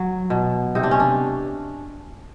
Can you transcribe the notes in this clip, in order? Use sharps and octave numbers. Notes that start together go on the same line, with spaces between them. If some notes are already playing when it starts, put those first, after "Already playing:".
Already playing: F#3
B2
C3 D#4
D4
C#4
D4